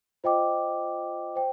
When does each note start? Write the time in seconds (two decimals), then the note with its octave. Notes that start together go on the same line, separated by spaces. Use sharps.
0.24 F4 C5 D#5 G5 D6
1.36 C5 G5